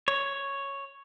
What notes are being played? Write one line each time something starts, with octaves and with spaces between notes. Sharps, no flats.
C#5